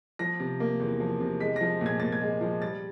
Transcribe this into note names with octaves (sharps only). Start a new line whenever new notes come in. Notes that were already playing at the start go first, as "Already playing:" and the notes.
F3 A#6
C3
A#3
E2
F3
C3
G#3 B6
F3 A#6
A#2
G#6
A#2 A6
G#6
G#3
F3
G3 A6